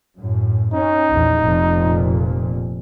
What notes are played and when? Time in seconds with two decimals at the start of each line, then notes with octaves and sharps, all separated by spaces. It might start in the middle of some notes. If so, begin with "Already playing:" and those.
0.18 F#2 A2
0.73 C#4 D#4
1.08 A#1 E2
1.41 F1 F2 A#2